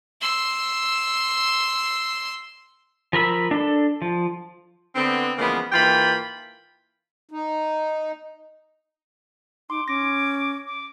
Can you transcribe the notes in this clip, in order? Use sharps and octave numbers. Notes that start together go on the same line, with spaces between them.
C6 E6
F3 A#4 B5 E6
D4 A4
F3
D3 B3 C4
C#3 E3 F3 G#3 A#3 B3
G#2 E3 A#3 F4 G5 B5
D#4
D#4 C6 D6
C#4 D6 A#6
D6